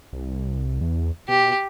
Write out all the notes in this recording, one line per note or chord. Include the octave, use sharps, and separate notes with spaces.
C2
E2
B2 G4